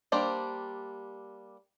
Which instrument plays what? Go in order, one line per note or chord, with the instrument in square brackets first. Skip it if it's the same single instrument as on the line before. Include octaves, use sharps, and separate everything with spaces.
[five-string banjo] G3 A#3 D4 G4 C5